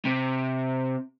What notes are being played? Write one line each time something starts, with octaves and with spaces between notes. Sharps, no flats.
C3